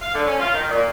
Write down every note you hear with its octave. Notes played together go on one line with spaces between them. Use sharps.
F5
D3
C#4
F4
D#3
A#2